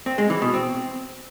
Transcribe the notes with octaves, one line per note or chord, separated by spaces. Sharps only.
C4
G#3
E3
B2
C4